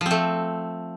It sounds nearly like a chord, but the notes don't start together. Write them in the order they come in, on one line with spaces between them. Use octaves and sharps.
F3 C4 A3